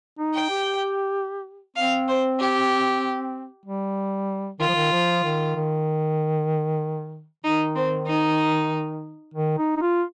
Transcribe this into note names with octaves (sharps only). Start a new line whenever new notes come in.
D#4
G5
G4
C4 F5
C5
G4
G3
D#3 F4
F3
D#3
F3
D#3
D#3
D#3 D#4
C4
D#4
D#3
D#4
D#4
F4